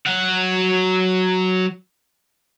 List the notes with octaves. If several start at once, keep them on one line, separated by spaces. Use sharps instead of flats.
F#3 F#5